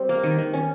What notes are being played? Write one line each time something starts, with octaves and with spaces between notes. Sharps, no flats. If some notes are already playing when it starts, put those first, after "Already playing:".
Already playing: G3 C4
A#3
D#3
D#3
C#4